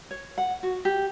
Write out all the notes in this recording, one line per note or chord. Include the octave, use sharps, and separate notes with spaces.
C#5
F#5
F#4
G4